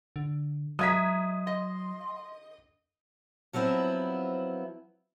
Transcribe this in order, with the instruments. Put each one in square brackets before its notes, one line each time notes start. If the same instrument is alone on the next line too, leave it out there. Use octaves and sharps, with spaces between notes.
[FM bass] D3
[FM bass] F#3 [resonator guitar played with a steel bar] G#3 E5 A#5 [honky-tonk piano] D#6 G#6 B6
[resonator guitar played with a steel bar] D#5 [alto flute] C6
[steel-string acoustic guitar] F3 F#3 B3 C4 E4